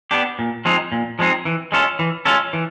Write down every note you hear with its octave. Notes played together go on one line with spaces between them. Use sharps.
B3 D4 G4
A#2
F3 G#3 C4 D#4
A#2
F3 G#3 C4 D#4
E3
G#3 C#4 F4 A4
E3
G#3 C#4 F4 A4
E3